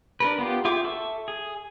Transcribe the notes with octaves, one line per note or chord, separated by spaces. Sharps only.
D4 A#4 B4
B3 F4 G4
F4 G#4 E5 G5 D6
A4 E5 C#6
G#4